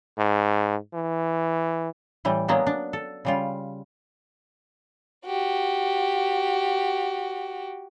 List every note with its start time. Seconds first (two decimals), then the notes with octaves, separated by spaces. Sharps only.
0.18 G#2
0.94 E3
2.25 A2 E3 G3
2.48 F#3 G#3 A#3 B3 D4
2.67 D4
2.93 A4
3.25 C#3 G3 F4
5.26 F#4 G4